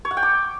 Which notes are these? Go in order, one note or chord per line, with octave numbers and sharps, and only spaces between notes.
C#5
F#5
G5
D6